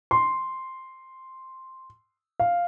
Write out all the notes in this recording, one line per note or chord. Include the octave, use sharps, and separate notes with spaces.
C6
F5